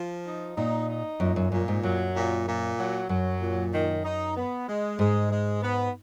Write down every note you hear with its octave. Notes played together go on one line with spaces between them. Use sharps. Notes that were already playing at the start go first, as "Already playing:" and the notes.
Already playing: F3
D#4
A#2 D#4
D#4
F#2 A#2
F#2
F#2 A#2
G#2
F#2 F#3
A#2
A#2
F#3
F#2 F#3
A#2
D#3
D#4
B3
G#3
G#2 G#3
G#3
B3